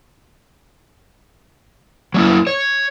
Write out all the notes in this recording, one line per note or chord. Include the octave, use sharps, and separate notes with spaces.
F#3 A#3 E4
C#5